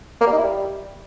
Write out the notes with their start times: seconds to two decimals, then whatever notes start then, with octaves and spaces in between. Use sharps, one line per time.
0.21 A#3
0.27 G3
0.32 D#4
0.38 E4
0.44 G3